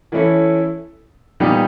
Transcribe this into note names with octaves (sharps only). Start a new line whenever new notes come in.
E3 A3 C#4 E4 A4
A#2 G3 B3 D#4 G4